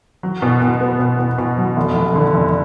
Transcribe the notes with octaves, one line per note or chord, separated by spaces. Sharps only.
F#3
B2
B2
B3
B2
B2
B2
F#3
F1
F1
D3
F1